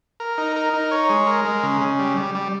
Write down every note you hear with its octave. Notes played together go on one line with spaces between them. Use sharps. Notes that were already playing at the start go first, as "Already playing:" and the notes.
A#4
D#4
A#4
D#4
C#5
G#3
A#4
G#3
C#3
C#3
G3
G3
G3